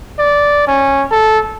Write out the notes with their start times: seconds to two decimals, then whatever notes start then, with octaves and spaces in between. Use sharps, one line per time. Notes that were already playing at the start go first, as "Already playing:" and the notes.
0.19 D5
0.68 C#4
1.11 A4